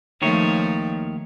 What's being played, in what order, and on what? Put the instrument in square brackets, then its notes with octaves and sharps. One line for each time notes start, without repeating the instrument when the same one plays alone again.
[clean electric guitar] D#2 D#3 C#5 [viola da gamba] F3 A3